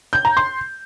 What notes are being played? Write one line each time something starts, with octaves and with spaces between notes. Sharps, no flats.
G6
A#5
C6